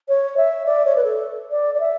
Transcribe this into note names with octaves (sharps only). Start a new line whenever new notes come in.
C#5
E5
D5
C#5
B4
A4
D5
D5
E5